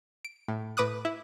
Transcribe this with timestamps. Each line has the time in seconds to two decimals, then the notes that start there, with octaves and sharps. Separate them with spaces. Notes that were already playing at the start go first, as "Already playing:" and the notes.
0.25 D7
0.48 A2
0.77 A2 B4 D6 D#6 F#6
1.05 E4